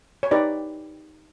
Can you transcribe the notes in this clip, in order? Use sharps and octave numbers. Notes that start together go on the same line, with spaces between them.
C#5
D#4 G4 B4 D5